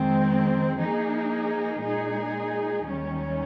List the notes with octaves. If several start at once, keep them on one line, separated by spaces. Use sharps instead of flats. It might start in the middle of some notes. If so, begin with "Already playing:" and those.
Already playing: F2 D#3 G#3 C4
F3 A#3 D#4 G#4
A#2 G#3 D#4 G#4
D#2 D#3 G3 C#4